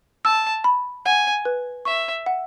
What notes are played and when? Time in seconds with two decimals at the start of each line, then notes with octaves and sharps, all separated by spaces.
0.25 A5 E6
0.64 B5
1.05 F#5 G#5
1.45 B4
1.85 E5 C#6
2.26 F#5